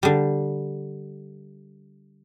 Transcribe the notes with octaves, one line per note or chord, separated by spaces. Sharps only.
D3 G3